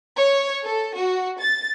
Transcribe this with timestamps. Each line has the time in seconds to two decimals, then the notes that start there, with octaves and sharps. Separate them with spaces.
0.19 C#5
0.65 A4
0.97 F#4
1.40 A6